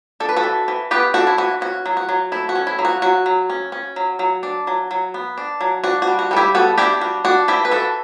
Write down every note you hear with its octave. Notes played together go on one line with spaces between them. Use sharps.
D4 A4
B4
F#4 A4
E3
E3
B3 G4 B4
D4 F#4 A4
E4
E3 F#4
C#4 F#4
F#3
F#4
F#3
A3 E4
F#4
C#4
E4
F#3
F#4
F#3 F#4
F#3
C#4
C#4
F#3
F#3
D4
F#3
F#3
B3
D4
F#3
D4 F#4
F#4
G3
F#4
G3 A4
E4 G4
B3 F#4 A4
D4 E4 G4
G3 F#4
D4 F#4
E3 E4 G4
B4
E3 F#4 A4